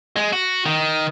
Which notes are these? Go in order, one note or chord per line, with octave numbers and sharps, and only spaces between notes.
G#3
F#4
D#3